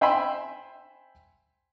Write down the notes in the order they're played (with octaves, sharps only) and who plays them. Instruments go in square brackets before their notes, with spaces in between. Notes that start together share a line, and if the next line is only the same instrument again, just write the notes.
[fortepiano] C5 E5 G5 G#5 B5 C6